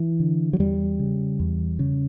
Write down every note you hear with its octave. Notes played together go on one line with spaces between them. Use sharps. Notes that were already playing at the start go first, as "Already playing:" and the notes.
Already playing: E3
D3
F#3
E2 G3
C#3
E2
C#3